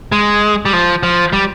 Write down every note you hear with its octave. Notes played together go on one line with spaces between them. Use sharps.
G#3
G3
F3
F3
G3